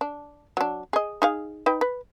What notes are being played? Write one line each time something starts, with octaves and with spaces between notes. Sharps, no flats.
D4
F#3 D4
G#4 D#5
D#4 G#4 F5
D#4 B4 G5
B4